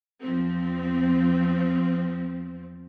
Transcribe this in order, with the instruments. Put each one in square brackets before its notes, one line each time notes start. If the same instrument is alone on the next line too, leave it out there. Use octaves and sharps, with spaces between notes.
[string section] E2 F3 C4